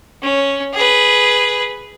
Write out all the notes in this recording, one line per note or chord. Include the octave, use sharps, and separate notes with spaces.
C#4
G#4 B4